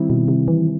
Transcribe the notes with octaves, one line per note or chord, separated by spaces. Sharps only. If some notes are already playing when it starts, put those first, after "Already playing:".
Already playing: D#3 G3 C4 E4
B2
C3
E3